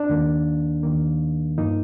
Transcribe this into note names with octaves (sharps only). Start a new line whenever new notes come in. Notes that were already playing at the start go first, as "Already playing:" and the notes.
Already playing: D4
D#2 D#3 A#3
D#2 D#3 A#3
G2 F3 A#3 D#4